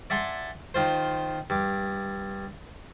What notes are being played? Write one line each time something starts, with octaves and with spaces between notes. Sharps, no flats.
D5 E5 F#5 G#5 A5 C6
D#3 F4 C5
G2 D6